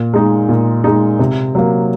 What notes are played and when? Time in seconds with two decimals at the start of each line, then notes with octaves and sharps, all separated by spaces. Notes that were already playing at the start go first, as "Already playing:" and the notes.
Already playing: A#2
0.14 G#3 D#4
0.49 A#2
0.84 G#3 D#4
1.19 C3
1.55 F#3 A#3